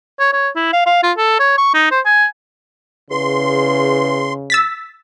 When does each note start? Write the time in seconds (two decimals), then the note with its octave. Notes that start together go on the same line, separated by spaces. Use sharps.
0.20 C#5
0.33 C#5
0.56 E4
0.73 F5
0.86 F5
1.03 F4
1.18 A4
1.40 C#5
1.58 C#6
1.74 D#4
1.91 C5
2.05 G#5
3.10 E2 C#3 C6
4.50 E6 A6 B6